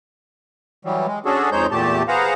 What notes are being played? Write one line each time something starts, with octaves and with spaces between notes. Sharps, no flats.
E3 F#3 G3
G#3
C#4 D4 F#4 G#4 A4
F2 G#3 D#4 C5 C#5 G6
E2 A#2 A3 G4 A5
G#4 B4 C5 F5 F#5 A#5